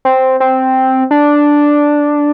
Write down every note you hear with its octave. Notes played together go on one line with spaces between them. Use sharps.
C4
C4
D4